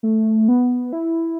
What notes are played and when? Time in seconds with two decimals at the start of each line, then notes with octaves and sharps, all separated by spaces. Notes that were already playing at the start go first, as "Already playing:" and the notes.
0.03 A3
0.48 B3
0.93 E4